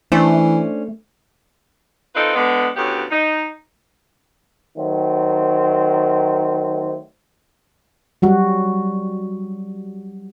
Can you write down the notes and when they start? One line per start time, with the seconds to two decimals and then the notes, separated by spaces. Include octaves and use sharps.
0.12 E3 A3 C#4 D4 C5
2.15 C4 D#4 F4 A4 B4
2.35 D3 G#3 B3
2.76 D2 A2 C#3 B3 G4
3.11 D#4
4.76 D#3 F#3 A3 C4
8.22 F#3 G3 F#4